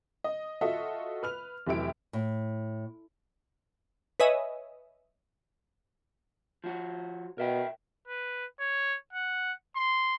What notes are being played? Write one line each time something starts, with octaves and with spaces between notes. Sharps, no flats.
D#5
F4 F#4 A4 D#5 E5
B4 F6 F7
F1 E3 F#3 E4 G4 D7
A2
B4 C#5 D#5 E5 G#5
F3 F#4
B2 A#4 E5 G5
B4
C#5
F#5
C6